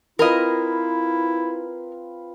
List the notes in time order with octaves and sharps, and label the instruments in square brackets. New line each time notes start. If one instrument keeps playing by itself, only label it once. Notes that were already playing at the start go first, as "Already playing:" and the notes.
[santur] C4 F4 B4 [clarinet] E4 [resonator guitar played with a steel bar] A#4 D#5